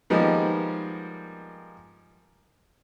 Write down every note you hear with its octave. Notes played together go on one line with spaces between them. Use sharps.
D#3 F3 G3 G#3 A#3 B3